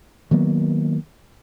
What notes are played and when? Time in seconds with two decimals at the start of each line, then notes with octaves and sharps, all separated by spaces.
0.31 D#3 F#3 A#3 B3